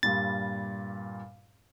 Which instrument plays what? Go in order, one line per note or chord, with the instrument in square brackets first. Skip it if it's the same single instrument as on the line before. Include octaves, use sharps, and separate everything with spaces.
[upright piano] G2 A#2 G3 [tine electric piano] A6